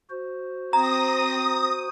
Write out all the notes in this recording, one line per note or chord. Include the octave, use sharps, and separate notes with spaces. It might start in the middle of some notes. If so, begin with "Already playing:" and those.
F#4 C5
C4 A#5 D#6 A#6